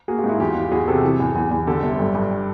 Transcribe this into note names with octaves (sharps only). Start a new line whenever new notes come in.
A#3 F#4 G#4
F4 G4
G#2
E4 F#4
E2 F4 G4
E3
E2 F#4 G#4
C3 G4 A4
E3
E2
E2
E2
D3 G4 A4
G1
G2
G2